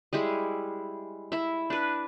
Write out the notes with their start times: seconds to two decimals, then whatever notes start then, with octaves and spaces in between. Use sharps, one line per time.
0.13 G3 G#3 E4 G#4
1.32 E4 E5
1.70 D4 B4